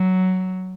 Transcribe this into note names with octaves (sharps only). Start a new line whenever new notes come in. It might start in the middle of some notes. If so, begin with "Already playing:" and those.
Already playing: F#3